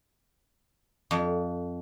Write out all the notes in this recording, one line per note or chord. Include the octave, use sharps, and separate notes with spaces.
F2